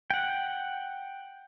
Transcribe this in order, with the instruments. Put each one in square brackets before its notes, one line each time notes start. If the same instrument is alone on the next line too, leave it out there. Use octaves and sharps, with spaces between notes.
[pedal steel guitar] F#5 G5